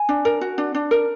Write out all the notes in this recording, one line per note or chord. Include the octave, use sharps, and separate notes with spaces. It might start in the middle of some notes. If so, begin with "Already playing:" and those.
Already playing: G#5
D4
A#4
F#4
D4
D4
A#4